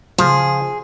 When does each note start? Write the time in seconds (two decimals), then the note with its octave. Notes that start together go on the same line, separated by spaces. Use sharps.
0.18 C#3 F3 G#4